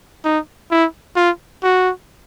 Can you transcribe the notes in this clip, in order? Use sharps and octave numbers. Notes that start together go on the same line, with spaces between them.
D#4
E4
F4
F#4